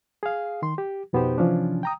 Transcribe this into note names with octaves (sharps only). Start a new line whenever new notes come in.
G#4 F5
D#3 C6
G4
F2 B2 B3 D#4 G4 C5
C3 E3 F3 C#4 D4
G5 A#5 D#6